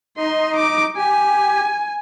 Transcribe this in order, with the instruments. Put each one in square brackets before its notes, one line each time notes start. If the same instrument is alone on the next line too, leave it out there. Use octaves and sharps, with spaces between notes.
[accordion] D#4 D#5 [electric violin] C6
[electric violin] D6
[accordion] G4 [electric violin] G#5